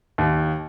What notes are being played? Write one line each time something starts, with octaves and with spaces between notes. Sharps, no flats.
D#2